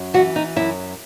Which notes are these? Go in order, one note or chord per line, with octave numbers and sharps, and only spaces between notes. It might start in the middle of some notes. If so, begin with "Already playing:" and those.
Already playing: F#2
E3 F#4
D#4
F#2 E4